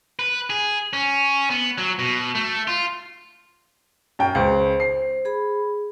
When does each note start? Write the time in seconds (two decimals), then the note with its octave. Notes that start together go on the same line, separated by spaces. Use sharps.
0.19 B4
0.50 G#4
0.93 C#4
1.50 B3
1.78 F#3
1.99 B2
2.35 A3
2.68 F4
4.19 F#2 G5
4.35 C#2 C5
4.80 C7
5.25 G#4 B5